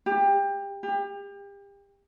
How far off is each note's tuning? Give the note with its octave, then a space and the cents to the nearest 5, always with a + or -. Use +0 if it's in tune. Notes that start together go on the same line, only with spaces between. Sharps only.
G4 +25
G4 +35